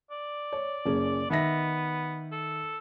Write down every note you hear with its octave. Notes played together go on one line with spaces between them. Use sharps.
D5
C#5
F#1 C#4 G#4
D#3 B3 E5 A#6
A4